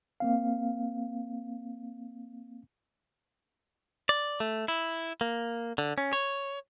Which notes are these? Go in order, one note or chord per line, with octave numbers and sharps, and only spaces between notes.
A#3 C4 F5
D5
A3
E4
A#3
D3
C#4
C#5